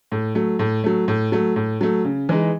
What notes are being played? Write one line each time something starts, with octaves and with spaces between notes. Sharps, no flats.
A2
F#3 A3
A2
F#3 A3
A2
F#3 A3
A2
F#3 A3
C#3
E3 G#3 D#4